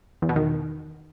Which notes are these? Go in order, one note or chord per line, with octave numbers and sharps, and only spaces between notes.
E2
B2
D#3